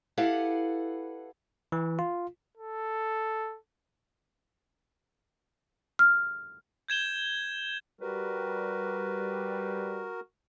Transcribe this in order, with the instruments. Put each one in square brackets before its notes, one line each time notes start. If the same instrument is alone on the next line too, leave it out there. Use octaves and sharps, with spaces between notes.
[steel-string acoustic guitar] E4 G4 A4 B4 F5 F#5
[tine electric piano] E3
F4
[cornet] A4
[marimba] F6
[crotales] G6 G#6 E7 G7
[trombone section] G3 [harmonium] F#4 A#4 [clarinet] B4